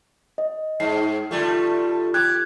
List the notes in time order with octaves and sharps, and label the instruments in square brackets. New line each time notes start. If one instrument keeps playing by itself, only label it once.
[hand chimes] D#5
[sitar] G#2 [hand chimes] C7
[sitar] D3 G3 A3 [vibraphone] F4
[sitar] G4 [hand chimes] F#6 G#6